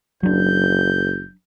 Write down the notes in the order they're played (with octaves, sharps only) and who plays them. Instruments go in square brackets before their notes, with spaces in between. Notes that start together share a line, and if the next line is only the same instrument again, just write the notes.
[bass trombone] F#1 [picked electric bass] F#3 D4 [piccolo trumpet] G6